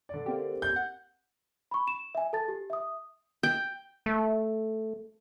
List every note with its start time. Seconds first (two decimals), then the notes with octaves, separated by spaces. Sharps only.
0.09 D3 D5
0.26 A#3 C4 G4
0.62 G6
0.76 F#5
1.71 B5 C#6
1.87 E7
2.15 E5 G#5
2.33 A4 A5 A6
2.48 G4
2.70 E5 D#6
3.43 G5
4.06 A3